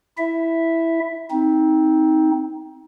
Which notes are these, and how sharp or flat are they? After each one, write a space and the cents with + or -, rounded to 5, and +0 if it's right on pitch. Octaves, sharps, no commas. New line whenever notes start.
E4 +0 E5 +0
C4 +0 D#4 +20